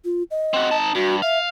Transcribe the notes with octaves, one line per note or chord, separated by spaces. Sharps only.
F4
D#5
C4 F#4
D#4 A5
G2 F#4
E5 F5